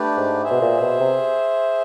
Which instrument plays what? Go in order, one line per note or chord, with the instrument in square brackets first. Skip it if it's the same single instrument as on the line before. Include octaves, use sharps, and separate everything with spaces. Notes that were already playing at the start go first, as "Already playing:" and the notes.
Already playing: [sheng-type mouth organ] A3 D4 G4 B4 D5
[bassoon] G#2
[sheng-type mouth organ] G#4 C5 E5
[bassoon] B2
A#2
B2
C3